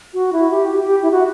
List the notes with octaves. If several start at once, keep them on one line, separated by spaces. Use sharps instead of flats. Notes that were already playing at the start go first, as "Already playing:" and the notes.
F#4
E4
G4
G4
G4
E4
F#4